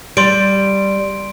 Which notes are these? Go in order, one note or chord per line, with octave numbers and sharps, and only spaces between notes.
G3 C6 D7